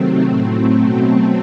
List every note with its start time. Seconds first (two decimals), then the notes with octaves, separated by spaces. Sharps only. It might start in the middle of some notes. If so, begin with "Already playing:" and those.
Already playing: C3 D#3 F#3 A3 C4
0.26 A2 F#3
0.78 B2 F#3